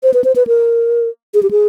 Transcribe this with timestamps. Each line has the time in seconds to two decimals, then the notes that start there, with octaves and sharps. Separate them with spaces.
0.03 C5
0.14 B4
0.24 C5
0.36 B4
0.47 A#4
1.34 G#4
1.43 G4
1.51 G#4